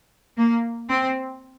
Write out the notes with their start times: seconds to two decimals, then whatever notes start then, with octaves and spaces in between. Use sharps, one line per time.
0.37 A#3
0.88 C4